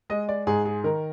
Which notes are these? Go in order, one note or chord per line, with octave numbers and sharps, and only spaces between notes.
G#3 D#5
D5
G#2 G#4
G#4
D#3 A#4